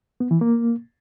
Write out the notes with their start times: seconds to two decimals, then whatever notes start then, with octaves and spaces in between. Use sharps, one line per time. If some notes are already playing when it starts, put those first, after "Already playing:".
0.20 B3
0.31 E3
0.41 A#3